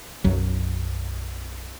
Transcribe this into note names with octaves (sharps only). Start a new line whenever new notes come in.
B1 F#2 F#3